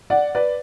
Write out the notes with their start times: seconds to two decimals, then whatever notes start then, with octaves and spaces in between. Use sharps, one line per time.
0.10 D5 F#5
0.35 B4 D5